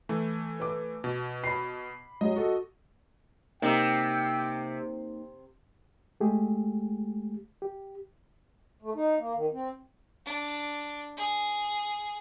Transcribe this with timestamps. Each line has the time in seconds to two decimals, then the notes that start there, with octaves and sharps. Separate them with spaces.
0.09 E3 A3
0.60 B4 D6
1.04 B2
1.44 B5 C7
2.21 F#3 G#3 D#5
2.36 F#4 A4
3.62 C3 A#3 D#4 G5
6.20 G#3 A3 G4 G#4
7.62 G4
8.82 A3
8.95 D#4
9.18 A#3
9.33 D#3
9.52 C4
10.26 D4
11.17 G#4